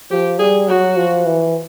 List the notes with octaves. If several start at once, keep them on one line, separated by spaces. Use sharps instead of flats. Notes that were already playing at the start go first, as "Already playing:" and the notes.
F3 G4
G3 G#4
F#3 F#4
F3
E3